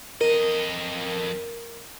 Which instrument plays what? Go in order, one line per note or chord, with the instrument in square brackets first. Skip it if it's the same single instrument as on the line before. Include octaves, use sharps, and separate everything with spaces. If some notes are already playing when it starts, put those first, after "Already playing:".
[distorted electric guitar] F2 D#5 [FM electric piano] A#4